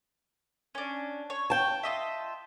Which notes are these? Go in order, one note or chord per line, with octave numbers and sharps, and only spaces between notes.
C#4 D4
C#5
G5 A5
F4 D#5 E5